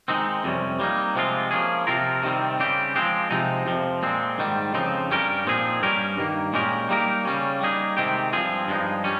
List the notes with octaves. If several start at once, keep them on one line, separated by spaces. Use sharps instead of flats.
D#3 G#3 C4 D#4
F2 C3 G3 C#4
G3 A#3 D#4
C3 F3 G#3 C4 F4
F3 A#3 C#4 G#4
C3 F3 C4 F4 A#4
C3 D#3 G3 C4
C#3 G3 C4 G4
F3 G#3 C4 G4
C3 F3 G#3 C4 D#4
F2 C3 F3
A#2 G#3 C4
G#2 D#3 G3
F2 C#3 F3 C4 D#4
G2 G3 C#4 G4 A#4
A#2 F3 C4 D#4 G#4
G2 G3 C#4 G4 A#4
G2 D#3 A#3
A#2 G#3 C#4 G4 A#4
G3 A#3 D#4 G4 A#4
C#3 G3 C#4
G3 A#3 D#4 G#4
C3 D#3 G#3 C4 G4
G2 F3 C4 F4 G#4
G2 F3 G#3 D#4
G3 C#4